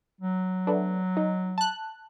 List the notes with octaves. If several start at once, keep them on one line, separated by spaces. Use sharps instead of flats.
F#3
A3 B3 D4
D#4
A5 F#6